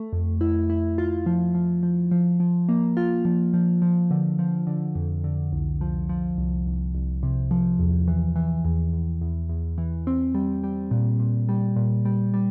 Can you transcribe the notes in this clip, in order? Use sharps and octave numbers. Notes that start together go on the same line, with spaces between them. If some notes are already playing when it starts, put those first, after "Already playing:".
Already playing: A3
F2
E4
E4
F4
F3
F3
F3
F3
F3
A#3
F4
F3
F3
F3
D3
F3
D3
F2
D3
C2
F3
F3
C2
C2
C2
C3
F3
E2
E3
E3
E2
E2
E2
E2
E3
C4
G3
G3
A#2
A#2
G3
A#2
G3
G3